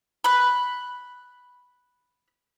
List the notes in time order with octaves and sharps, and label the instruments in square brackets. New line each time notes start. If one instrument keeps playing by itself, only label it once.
[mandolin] B5 F#6